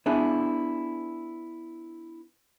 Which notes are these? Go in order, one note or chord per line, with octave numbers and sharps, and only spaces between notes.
B3 D4 E4 G#4